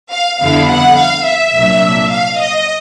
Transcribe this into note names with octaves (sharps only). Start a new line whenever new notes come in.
F5
F2 D3 G3 B3 E4 F5
F#5
F5
E5
C2 A#2 F#3 A#3 D4
F5
D#5